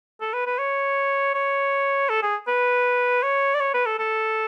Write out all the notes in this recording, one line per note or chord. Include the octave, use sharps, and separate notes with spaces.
A4
B4
B4
C#5
C#5
A4
G#4
B4
C#5
D5
C#5
B4
A4
A4